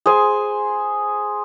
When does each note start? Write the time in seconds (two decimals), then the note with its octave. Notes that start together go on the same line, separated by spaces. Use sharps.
0.06 G#4 C5 G#5